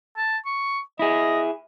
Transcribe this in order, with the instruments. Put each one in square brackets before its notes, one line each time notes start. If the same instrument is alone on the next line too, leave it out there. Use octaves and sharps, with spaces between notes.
[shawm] A5
C#6
[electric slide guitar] E4 G#4 [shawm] D#5